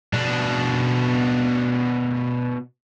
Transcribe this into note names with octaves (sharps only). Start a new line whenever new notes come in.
B2 D4